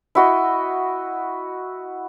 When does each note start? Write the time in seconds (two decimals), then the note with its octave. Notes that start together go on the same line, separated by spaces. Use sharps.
0.15 E4 F#4 D#5